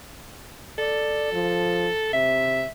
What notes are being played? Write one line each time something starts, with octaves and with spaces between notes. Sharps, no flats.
A4 D5
F3
C3 E5